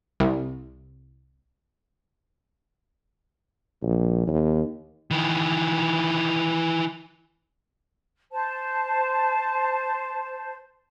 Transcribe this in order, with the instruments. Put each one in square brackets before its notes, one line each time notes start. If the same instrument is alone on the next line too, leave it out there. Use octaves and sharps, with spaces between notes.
[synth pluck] C2
[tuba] A#1
D#2
[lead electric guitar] D#3 E3
[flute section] C5 A5